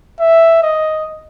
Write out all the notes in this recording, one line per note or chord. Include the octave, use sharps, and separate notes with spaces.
E5
D#5